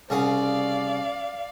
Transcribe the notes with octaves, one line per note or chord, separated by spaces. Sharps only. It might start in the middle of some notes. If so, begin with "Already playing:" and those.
C2 C#3 D5 F5 F#5